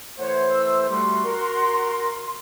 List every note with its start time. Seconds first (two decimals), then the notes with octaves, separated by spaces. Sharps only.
0.19 E3 A3 C5 C#5 F#5
0.48 E6
0.90 G3 A3 F#4 C6
1.25 A#4